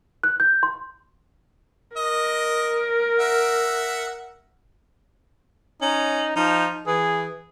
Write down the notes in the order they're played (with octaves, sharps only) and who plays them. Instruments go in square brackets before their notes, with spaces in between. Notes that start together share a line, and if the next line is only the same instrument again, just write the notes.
[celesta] F#6
G6
C6
[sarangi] A#4 [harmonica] D#5
[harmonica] E5 F#5
[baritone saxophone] C#4 [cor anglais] D#4
[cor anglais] F3 [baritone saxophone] D#4
[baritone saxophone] E3 [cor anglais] G#4